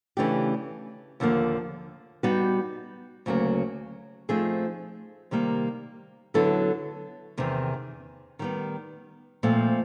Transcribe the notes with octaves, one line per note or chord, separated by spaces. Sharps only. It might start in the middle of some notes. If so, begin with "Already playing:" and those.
C#3 E3 A3 D4 G4
D#2 D3 F3 A#3
G3 B3 D#4 F#4 B4
D2 C#3 F#3 A#3
F3 A3 C4 D#4 G#4
C3 D#3 G3 A#3
D3 F#3 B3 E4 A4
E2 C3 D#3
D#3 G3 B3
A#2 F3 A3 C4